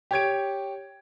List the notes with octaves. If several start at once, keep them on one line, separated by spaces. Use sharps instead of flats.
G4 C#5 G#6 D7